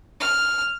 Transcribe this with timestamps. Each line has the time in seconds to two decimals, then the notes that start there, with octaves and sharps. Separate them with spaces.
0.20 F6